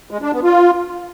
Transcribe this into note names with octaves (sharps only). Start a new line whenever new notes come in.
G#3
D4
B3
F4